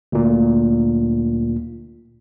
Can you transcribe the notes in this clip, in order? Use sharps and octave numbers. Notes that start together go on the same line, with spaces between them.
D2 A#2